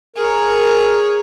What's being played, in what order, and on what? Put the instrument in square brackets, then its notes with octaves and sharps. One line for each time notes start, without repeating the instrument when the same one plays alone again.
[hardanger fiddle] G#4 C#5 [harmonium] A#4